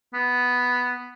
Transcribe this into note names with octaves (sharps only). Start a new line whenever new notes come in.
B3